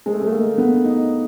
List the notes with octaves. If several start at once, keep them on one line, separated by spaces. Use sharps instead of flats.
G#3
A3
G#3
A3
A#3
B3
D#4